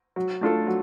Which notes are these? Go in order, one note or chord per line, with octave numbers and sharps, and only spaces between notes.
F#3
A3 D4 F4 A4
F#3